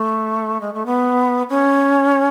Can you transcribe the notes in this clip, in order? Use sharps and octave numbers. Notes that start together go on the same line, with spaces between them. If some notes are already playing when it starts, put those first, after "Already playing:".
Already playing: A3
G#3
A3
B3
C#4